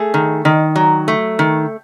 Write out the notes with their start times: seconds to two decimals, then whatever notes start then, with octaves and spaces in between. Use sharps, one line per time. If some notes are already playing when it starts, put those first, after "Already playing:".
Already playing: A3 G#4
0.14 D#3
0.45 D#3
0.76 F#3
1.08 A3
1.39 D#3